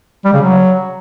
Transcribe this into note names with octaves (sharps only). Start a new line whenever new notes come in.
G3
C#3
F#3